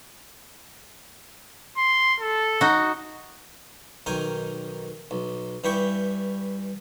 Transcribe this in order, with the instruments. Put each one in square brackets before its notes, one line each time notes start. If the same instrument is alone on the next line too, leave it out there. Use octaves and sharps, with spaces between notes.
[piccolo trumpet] C6
A4
[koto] D#4 F#4
[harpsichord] B1 D#3 A#4 G5 G#5
B1
G2 E3 E4 G4 G5 C#6